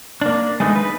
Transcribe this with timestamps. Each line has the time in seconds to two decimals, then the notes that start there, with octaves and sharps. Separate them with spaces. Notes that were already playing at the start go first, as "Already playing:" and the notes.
0.21 A#3 D4
0.60 G#3 A3 B3 D#4
0.76 B4